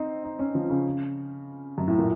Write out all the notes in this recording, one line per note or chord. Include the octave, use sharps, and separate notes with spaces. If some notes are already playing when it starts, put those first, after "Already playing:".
Already playing: C4 D#4
D#4
C#4
F3
C#3
F#2
A2
A#2